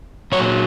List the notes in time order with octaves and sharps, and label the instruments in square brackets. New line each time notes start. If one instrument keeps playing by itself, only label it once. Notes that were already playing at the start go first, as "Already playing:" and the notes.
[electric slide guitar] A#2 F#3 C#5